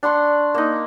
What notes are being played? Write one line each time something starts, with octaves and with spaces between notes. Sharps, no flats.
D4 F#5 C6 C#6
A#3 D#4